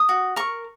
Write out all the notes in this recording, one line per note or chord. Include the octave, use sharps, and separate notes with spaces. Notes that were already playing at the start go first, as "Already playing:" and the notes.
Already playing: D#6
F#4
A#4 C#6